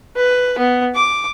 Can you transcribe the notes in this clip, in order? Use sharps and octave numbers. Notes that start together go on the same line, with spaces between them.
B4
B3
D6